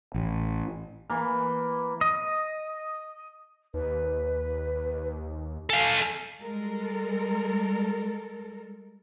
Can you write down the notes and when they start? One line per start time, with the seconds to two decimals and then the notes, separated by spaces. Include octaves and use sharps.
0.14 A1
1.10 E3 A#3
2.01 D#5
3.74 D#2 B4
5.70 A4 F5 G#5
6.41 G3 G#3 A4 A#4